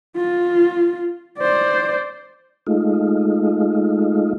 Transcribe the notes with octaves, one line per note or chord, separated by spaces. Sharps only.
F4
C5 D5
G#3 A3 D#4 F4